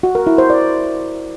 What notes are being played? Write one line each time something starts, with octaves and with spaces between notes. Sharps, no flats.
F#4
A#4
E4
C5
D5